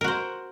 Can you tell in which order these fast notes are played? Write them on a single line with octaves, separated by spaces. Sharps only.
A#4 F#4 C5